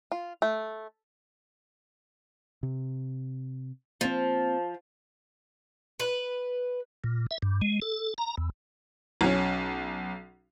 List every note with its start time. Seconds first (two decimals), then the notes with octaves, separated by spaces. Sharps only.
0.12 F4
0.42 A3
2.63 C3
4.01 F3 A#3 C4
6.00 B4
7.04 A#2
7.31 E5
7.42 G2
7.62 G#3
7.82 A4
8.18 A#5
8.37 E2
9.21 B1 C#4